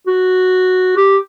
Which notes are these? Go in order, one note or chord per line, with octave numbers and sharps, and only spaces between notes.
F#4
G4